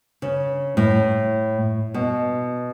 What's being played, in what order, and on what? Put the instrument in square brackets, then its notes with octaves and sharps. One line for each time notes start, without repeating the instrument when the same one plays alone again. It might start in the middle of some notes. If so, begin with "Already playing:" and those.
[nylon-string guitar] C#3
A2
B2